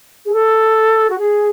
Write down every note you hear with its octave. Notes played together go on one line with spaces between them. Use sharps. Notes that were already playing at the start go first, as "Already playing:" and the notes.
G#4
A4
F#4
G#4